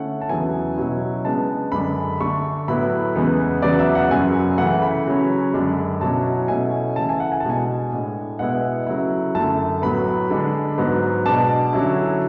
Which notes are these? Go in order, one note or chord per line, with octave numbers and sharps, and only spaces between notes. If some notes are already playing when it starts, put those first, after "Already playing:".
Already playing: D3 A3 C#4 E4 F#5
A5
E2 C#3 F#3 B3 E4 G#5
B2 F#3 C#4 E4
C#3 G#3 B3 D4 A5
F#2 D3 G#3 D4 B5
D3 A3 D4 C#6
A2 F#3 B3 E4 B5
E2 C#3 G#3 B3
E2 C#3 F#3 B3 D5
E5
F#5
F#2 C#3 F#3 G#5
C#3 E3 A3 F#5
B5
C#3 F#3 C#4
F#2 D3 G#3 D4
B2 F#3 C#4 E4 A5
B2 A3 C#4 E4 G#5
C#3 E3 A3 E4 A5
G#5
F#5
G#5
A5
B2 G#3 D4 G#5
A2 G#3 D4
B2 G#3 B3 E4 F#5
C#3 F#3 A3 E4
F#2 D3 A3 A5
A2 F#3 B3 B5
D3 G#3 D4
G#2 F#3 B3
B2 G#3 D4 A5
D3 F#3 C#4 E4